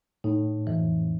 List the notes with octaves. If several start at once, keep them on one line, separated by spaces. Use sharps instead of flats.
A2 D#4
F2 E3